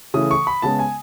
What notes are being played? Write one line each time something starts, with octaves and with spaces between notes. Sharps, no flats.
C#3 E3 A3 D#6
C#6
B5
C#3 G#3 B3 A5
G#5